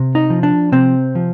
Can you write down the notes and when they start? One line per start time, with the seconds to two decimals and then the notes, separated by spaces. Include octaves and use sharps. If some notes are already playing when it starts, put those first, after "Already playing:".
Already playing: C3
0.15 D#4
0.30 F3
0.43 D4
0.72 C3 C4
1.15 F3